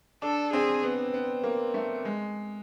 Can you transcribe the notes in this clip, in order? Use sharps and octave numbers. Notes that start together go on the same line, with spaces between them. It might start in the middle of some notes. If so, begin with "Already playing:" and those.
D4 A4
C4 G#4
B3
B3
A#3
A3
G#3